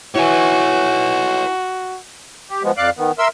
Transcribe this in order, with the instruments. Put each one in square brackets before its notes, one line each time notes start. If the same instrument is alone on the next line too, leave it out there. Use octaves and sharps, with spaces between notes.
[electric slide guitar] E4 E5 G#5 [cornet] F#4 [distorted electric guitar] B4 C#5
[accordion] G4
F3 G#3 B3
F2 D5 F5 D6 F#6
D#3 B3
A#4 E5 C6 E6